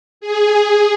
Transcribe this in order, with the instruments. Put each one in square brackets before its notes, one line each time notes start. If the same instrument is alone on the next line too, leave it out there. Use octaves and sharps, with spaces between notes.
[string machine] G#4